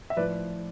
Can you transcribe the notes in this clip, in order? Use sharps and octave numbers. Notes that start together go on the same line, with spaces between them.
E5
A2 F3 B4 D5